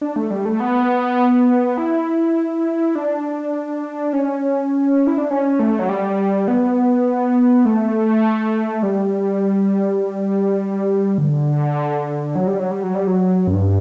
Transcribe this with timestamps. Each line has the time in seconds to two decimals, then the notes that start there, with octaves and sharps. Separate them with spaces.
0.01 D4
0.16 A3
0.31 G3
0.45 A3
0.60 B3
1.78 E4
2.95 D4
4.13 C#4
5.07 E4
5.18 D4
5.31 C#4
5.59 A3
5.79 F#3
5.89 G3
6.48 B3
7.65 A3
8.83 G3
11.18 D3
12.35 F#3
12.47 G3
12.59 F#3
12.71 G3
12.83 F#3
12.95 G3
13.07 F#3
13.47 F#2
13.53 G2